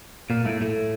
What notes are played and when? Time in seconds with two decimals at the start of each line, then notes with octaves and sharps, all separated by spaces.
0.30 A#2 A#3
0.45 A2 A3
0.61 A2 A3